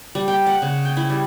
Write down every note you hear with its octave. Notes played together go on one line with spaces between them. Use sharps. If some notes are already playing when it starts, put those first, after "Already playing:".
G3
G5
F#5
C#3
G5
E4
G3